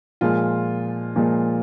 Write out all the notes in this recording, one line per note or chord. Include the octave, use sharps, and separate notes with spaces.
A#2 F3 G#3 F4
A#2 F3 G#3